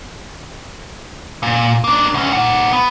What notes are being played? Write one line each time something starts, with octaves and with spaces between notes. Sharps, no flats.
A#2
A#3 D4
D2 C#4
A#3 F#5
B3